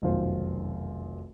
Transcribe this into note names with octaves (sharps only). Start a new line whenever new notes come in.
F1 B1 F#2 D#3 F4 C5